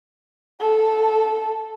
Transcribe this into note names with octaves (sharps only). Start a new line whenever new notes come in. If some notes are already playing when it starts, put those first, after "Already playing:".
A4